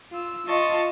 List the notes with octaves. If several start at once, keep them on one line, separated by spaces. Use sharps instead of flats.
F4 E6
F4 D#5 A5 C#6